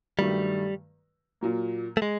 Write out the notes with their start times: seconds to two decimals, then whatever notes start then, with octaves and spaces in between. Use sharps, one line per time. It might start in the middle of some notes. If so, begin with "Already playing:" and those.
0.19 G2 D#3 F#3 G3 A3
1.41 A#2 F#3 A#3
1.97 A3
2.02 G#3